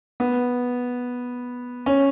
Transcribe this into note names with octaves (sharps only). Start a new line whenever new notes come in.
B3
C#4